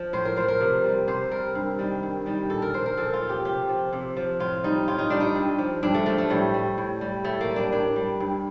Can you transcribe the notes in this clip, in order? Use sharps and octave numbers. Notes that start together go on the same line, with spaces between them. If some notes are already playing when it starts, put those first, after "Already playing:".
Already playing: F3
A2 C5
A#4
F3 C5
A#4
C3
G3
C3 C5
G3 A#4
G2
D#3 G3
G2
D#3 G3
A#2 A4
A#4
F3 C5
A#4
A#2 A4
F4
F3
G4
C3 G4
F3
C3
F3
A2 F4
G3 D#4
A2 F4
D#4
G3 D4
D#4
G2
F3
G2 D4
A3
F3 A3
A3
A2 G3
G3
A2
G3
A2 A3
A#3
G3
D4
A2 D4
G3
G2